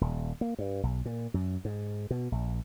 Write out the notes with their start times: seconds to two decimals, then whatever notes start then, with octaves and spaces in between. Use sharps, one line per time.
0.01 D#1
0.41 A#3
0.59 G2
0.83 B1
1.05 A#2
1.34 F#2
1.65 G#2
2.11 B2
2.32 A#1